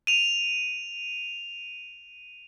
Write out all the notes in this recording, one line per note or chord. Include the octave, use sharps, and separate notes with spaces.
D#7 F7